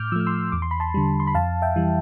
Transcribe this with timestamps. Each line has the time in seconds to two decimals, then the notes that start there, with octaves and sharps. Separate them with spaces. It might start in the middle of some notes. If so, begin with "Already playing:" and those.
Already playing: A2 D6 F6 G6
0.12 F3 E6
0.16 A3 F6
0.26 C6 E6
0.52 E2 D6
0.62 C6
0.71 B5
0.80 A5 C6
0.94 D3 G3
1.20 C6
1.27 B5
1.35 F2 F5 A5
1.62 E5 G5
1.76 E3 G3